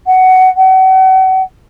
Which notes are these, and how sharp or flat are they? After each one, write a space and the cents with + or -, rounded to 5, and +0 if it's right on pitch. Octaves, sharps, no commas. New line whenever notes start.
F#5 +15
F#5 +40